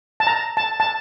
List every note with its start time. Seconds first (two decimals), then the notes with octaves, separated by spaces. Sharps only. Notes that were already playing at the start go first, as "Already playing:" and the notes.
0.20 A5
0.27 A#5
0.57 A5
0.80 A5